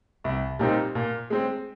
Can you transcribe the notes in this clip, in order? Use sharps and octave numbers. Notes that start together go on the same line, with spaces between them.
C2
A#2 G3 C4 D#4
A#2
G#3 C4